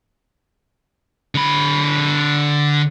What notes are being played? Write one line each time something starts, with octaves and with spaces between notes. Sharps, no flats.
D3 B5